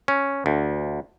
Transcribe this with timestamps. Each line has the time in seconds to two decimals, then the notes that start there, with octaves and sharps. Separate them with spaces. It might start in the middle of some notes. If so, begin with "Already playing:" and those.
0.08 C#4
0.46 D2